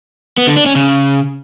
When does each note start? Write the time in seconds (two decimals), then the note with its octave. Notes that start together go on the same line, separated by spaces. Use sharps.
0.38 B3
0.47 D3
0.57 D4
0.66 C#4
0.76 C#3